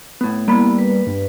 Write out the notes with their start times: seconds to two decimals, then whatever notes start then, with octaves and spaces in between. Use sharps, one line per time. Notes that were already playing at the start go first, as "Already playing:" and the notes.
0.21 A2 B3
0.48 G3 A#3 B3 E4 B5
0.79 B4
1.07 G2